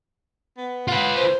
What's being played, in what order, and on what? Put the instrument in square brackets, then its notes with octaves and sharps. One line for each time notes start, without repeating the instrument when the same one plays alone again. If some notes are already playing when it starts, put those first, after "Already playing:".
[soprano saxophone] B3
[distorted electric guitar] F4 B4 [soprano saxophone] F#5
[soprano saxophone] C5